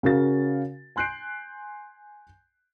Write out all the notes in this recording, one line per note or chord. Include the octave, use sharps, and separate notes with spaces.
C#3 C#4 F#4 A#4 F5 A6
G#5 C6 F#6 G6 C7 D7